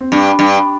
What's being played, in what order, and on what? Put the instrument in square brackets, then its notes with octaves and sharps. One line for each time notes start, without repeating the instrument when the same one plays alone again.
[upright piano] C4
[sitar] G2 [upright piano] D4
[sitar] G2